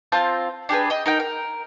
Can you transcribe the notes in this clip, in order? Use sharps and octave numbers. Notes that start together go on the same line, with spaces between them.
C4 F4 A5 G6
D4 G4 G#4 B4
D#5 G5
D#4 A#4 G5
A#4